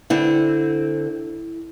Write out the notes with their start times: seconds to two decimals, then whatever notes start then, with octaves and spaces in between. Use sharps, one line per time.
0.10 D3 C4 E4